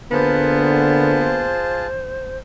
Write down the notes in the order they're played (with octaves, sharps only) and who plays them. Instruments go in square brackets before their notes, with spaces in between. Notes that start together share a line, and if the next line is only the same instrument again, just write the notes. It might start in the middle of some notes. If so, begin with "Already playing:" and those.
[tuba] D3 [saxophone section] A#3 B3 [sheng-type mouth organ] F4 G#4 A5 [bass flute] C5